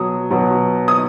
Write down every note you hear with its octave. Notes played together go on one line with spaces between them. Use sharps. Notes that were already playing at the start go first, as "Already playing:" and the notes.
Already playing: B2 F#3 D#6
B2 F#3
D#6